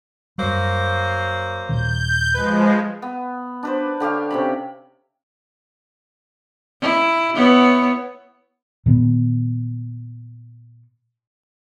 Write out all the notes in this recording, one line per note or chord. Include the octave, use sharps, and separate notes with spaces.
F#2 F#3 G3 A#3 C5
D#1 A#2 D#3 G6
F3 G#3 B4
B3
D4 B4 C5
D3 G4 C#5 F5
C3 C#4 B5
E4
B3 E4 C#5
A#2 D#3 B3